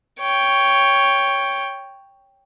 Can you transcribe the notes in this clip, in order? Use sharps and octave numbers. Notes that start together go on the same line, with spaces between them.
C#5 G5